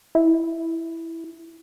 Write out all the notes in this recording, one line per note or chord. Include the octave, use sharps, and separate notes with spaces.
E4